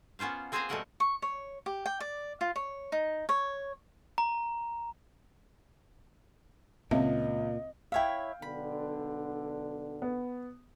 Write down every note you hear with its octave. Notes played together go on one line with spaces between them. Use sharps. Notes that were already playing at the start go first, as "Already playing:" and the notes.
B3 C#4 F4 C5 F5
A#3 C4 G#4 C5 G#5 A#5
B2 G3 A3 A#4 F#5 G5
C#6
C#5
G4
G5
D5
F4
C#5
D#4
C#5
A#5
C#2 A#2 C4 D#5 E5
E4 C#5 E5 F5 G5
B1 B2 D3 B5
B3